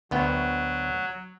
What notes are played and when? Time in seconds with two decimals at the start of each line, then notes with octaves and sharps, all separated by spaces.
0.11 D2 F#3 B3 G5